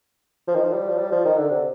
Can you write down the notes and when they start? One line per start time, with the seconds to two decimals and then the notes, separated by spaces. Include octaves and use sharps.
0.48 F3
0.55 D#3
0.63 F3
0.74 G3
0.89 F3
0.99 G3
1.12 F3
1.25 D#3
1.37 D3
1.50 C3